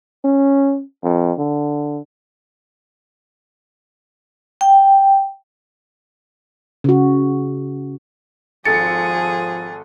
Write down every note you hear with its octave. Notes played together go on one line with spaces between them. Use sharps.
C#4
F2
D3
G5
C#3 F#4
G#1 F3 G#4 A4 A6 C#7